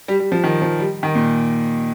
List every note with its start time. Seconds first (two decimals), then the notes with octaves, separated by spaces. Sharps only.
0.08 G3
0.20 G3
0.32 F3
0.44 D#3
0.62 F3
0.80 G3
1.03 D#3
1.15 A#2